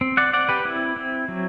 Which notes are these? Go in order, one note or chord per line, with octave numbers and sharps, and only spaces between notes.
C4
D5 F#5
C4 D5 F#5
G4 B4
C4 E4
C4
F#3